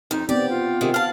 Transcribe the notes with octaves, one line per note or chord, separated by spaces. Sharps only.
F2 D#4
B3 C4 G4 D5
F4
C3 D#3 G#3
F5 F#5 A5